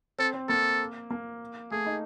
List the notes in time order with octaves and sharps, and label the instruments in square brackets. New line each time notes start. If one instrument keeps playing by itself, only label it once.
[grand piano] C4 [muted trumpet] A4
[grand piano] C4
[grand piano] A#3 [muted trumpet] A4
[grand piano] A#3
[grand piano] A3 [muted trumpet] G#4
[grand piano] D#4